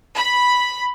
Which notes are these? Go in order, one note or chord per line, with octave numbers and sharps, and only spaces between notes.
B5